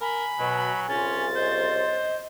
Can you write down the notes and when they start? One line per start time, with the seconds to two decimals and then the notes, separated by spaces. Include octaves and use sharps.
0.01 A#4 G#5 B5
0.39 B2 F#3
0.89 C2 C#3 C#4 F4 A6
1.36 C5 D#5